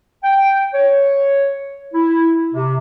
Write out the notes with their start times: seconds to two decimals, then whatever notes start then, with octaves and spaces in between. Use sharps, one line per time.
0.24 G5
0.74 C#5
1.94 E4
2.53 C3